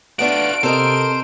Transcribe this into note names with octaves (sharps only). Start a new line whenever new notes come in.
A3 B3 D4 F4 F#4 D7
C3 A4 A#4 C5 D#5